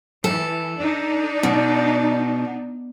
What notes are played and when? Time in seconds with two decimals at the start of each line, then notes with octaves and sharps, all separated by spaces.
0.24 E3 A4
0.79 D4 D#4
1.43 B2